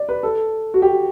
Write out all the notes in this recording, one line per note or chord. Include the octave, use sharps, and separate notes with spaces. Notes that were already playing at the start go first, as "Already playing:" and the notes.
Already playing: D5
B4
A4
F#4
G4